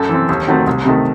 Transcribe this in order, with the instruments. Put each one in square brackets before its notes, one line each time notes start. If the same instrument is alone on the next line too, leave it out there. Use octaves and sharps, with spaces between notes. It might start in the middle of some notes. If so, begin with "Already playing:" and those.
Already playing: [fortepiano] F#2 A4
E3 C4
D#2
D#3 F#3 A3 C4
C2
C3 D#3 A3